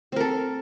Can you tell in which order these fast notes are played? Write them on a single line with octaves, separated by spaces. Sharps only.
C4 A#4 A4